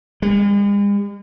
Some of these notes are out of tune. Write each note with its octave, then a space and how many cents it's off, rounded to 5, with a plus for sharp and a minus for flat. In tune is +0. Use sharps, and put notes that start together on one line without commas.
G#3 -45